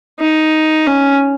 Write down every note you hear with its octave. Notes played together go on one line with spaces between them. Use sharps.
D#4
C#4